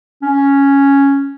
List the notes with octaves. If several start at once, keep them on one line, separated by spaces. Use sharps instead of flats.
C#4